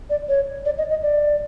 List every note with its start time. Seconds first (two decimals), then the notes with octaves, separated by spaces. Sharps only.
0.10 D5
0.28 C#5
0.65 D5
0.78 D#5
0.90 D#5
1.02 D5